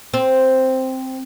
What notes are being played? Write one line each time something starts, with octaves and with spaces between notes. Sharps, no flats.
C4